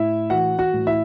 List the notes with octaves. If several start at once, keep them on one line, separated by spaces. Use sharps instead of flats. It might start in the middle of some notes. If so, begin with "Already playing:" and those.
Already playing: A2 E4 E5
E3 F#4 F#5
F#4 F#5
A2
E4 E5